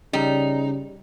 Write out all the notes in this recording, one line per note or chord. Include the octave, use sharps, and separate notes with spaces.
C#3 G3 D#4